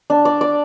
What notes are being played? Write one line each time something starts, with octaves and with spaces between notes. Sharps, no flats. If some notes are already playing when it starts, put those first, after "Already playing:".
D4
D5
D5